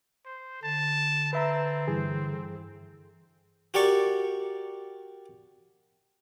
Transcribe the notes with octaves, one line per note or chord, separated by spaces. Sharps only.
C5
D3 A5
C4 B4 E5 A#5
G2 E3 G#4
F#4 G4 A#4 D5 C#6